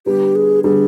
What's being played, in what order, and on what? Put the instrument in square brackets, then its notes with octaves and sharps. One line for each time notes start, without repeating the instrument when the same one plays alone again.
[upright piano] D3 G3 B3 [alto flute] G4
[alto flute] G#4
[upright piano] D3 G3 B3 [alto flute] G#4